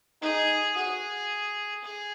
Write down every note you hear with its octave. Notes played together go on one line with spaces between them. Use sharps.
D#4 G#4
F#4 G#4
G#4